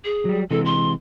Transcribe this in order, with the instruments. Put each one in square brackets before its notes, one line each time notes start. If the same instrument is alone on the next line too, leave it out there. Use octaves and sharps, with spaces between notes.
[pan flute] G#4
[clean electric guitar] F#3 G3
[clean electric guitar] C3 E3 G#3 [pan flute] A4
[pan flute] C6